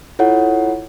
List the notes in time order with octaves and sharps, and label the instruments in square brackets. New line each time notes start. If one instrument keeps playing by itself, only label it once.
[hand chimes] E4 F4 A4 C#5 F#5